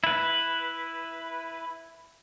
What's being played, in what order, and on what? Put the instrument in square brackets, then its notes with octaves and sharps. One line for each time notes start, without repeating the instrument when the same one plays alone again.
[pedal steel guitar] E4 B4